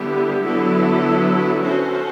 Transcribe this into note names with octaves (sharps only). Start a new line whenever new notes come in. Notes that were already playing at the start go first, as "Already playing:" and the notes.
Already playing: D3 G3 B3 E4 G4
D3 F#3 B3 E4 A4
C#4 F#4 A4 C5